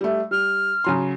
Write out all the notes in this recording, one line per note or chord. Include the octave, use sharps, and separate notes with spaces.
G3 A3
G3 F6
C#3 F#3 C6